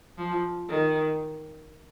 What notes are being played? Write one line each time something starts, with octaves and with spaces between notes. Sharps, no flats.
F3
D#3